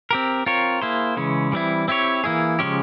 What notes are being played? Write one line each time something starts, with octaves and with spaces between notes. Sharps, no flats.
C4 G4 A#4
C4 F4 A#4 C#5
A#3 E4 G#4 C5
C#3 E3 G#3 C#4
E3 G3 C4 E4
C4 E4 G4 C#5
E3 A#3 E4 G#4
C#3 F3 G#3 C#4 G4